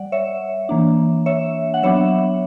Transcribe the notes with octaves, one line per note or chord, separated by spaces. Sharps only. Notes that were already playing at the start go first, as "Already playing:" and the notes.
Already playing: G3 D5 F#5
C#5 E5
E3 A#3 D4
C#5 E5
F#5
F#3 B3 D4 C#5 E5